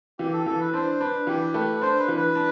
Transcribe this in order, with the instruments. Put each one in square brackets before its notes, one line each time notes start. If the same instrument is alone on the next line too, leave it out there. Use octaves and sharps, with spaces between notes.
[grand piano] E3 [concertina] G4
[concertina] A4
[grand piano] E3 [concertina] A4
[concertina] B4
[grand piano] D4 [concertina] C5
[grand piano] D4 [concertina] B4
[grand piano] E3 [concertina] G4
[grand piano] A3 [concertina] B4
[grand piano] D4 [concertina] C5
[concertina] B4
[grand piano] E3
[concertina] B4
[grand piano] D4